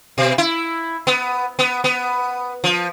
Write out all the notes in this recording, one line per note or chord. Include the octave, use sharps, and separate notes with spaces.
B2
E4
B3
B3
B3
F3